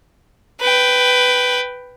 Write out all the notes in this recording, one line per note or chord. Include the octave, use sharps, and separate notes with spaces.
B4 G5